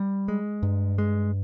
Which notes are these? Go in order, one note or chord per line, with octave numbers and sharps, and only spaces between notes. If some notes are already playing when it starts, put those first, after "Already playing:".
Already playing: G3
G#3
G2
G#3